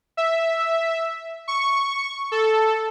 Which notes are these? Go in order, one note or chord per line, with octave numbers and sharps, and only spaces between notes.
E5
C#6
A4